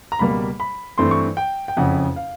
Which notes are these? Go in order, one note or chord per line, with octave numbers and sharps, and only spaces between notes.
A#5
C#2 B2 G3 A#3 B5
B5
G2 E3 A3 C4 C6
C#6
G5
G5
F#1 F2 C#3 F#5
F5